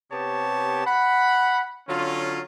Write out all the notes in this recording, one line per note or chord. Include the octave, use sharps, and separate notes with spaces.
C3 B3 G4 C#5 A5
F#5 B5
D3 F#3 C#4 F4